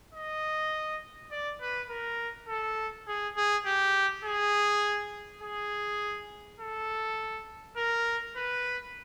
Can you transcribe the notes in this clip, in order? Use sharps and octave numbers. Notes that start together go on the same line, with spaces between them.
D#5
D5
B4
A#4
A4
G#4
G#4
G4
G#4
G#4
A4
A#4
B4